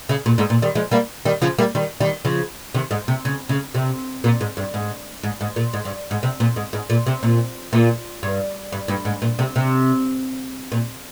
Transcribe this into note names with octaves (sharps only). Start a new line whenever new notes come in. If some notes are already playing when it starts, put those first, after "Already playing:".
C#3
A#2
G#2
A#2
D#3 G3
F3 G#3
G3 A#3
D#3 G3
C#3 F3
G3 A#3
D#3 G3
D#3 G3
C#3 F3
C3 D#3
G#2
C3
C#3
C#3
C3
A#2
G#2
G2
G#2
G#2
G#2
A#2
G#2
G2
G#2
C3
A#2
G#2
G#2
A#2
C3
A#2
A#2
G2
G2
G2
G#2
A#2
C3
C3
A#2